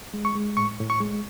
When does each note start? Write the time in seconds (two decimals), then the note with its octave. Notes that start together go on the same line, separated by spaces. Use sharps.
0.14 G#3
0.25 C#6
0.35 G#3
0.57 A2 C#6
0.80 A2
0.90 C#6
1.00 G#3